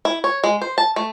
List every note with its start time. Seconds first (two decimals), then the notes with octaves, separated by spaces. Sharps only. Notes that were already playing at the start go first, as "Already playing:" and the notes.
0.05 E4
0.24 C#5
0.44 G#3
0.62 C5
0.78 A5
0.96 A3